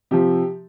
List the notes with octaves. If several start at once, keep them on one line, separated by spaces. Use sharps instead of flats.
C3 F3 G4